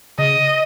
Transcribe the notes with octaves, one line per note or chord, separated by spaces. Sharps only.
C#3 D#5